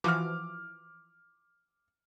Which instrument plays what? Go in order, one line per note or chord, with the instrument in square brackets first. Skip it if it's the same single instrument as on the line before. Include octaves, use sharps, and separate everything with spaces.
[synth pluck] E3 F3 F#4 [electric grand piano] D6 F6